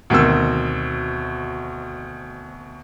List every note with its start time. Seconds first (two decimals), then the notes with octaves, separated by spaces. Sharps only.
0.10 D2 B2 D#3 C4 E6